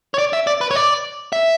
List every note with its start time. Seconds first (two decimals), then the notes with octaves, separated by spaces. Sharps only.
0.14 C#5
0.18 D5
0.33 E5
0.47 D5
0.61 B4
0.71 C#5
0.76 D5
1.33 E5